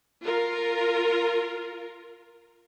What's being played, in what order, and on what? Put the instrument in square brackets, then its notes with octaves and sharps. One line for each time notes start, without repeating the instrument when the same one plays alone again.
[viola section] F4 A#4